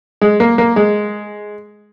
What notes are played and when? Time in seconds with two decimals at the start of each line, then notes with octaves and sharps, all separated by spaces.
0.21 G#3
0.40 A#3
0.58 A#3
0.76 G#3